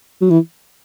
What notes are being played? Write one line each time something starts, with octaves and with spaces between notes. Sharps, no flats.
F#3
E3